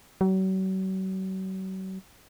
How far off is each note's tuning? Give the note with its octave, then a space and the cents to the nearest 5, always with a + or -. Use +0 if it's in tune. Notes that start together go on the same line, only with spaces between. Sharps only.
F#3 +40